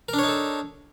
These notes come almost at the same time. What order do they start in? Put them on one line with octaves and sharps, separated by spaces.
A#4 D4 C#5 D#4 A4